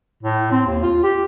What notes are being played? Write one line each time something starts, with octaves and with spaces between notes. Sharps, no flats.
A2
C4
D#2
F4
G4